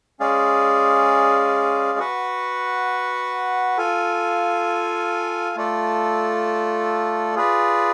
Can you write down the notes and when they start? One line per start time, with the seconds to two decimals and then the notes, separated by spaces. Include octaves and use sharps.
0.20 G#3 C#4 G#4 D5 F5
1.98 F#4 B4 F#5
3.77 F4 A4 F5 G#5
5.56 A3 F4 A4 D5
7.35 F4 G#4 B4 D5